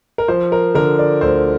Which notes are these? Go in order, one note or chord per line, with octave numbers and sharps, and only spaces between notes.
A#4
F3 C5
A#4
D3 A#4
D5
D2 C5